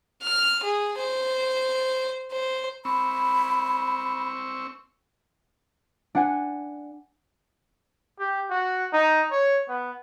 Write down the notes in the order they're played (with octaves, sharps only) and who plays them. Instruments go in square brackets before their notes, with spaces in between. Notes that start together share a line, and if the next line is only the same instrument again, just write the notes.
[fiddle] F6
G#4
C5
C5
[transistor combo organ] C4 C#6 E6 [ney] B5
[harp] D4 F#5 G#5
[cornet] G4
F#4
D#4
C#5
B3